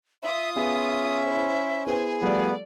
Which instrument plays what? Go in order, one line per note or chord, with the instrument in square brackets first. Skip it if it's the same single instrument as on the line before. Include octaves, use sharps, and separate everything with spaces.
[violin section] F4 D#6 [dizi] E5
[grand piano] B3 G#4 [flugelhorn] C#4 [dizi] E5
[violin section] E4 C5
[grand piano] B3 E4 B4 [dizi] G#4 [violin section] C5 G#5
[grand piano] F3 G3 A3 [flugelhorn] B3 [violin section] D5